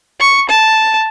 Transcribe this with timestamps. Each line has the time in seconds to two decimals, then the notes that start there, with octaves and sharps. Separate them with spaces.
0.20 C#6
0.49 A5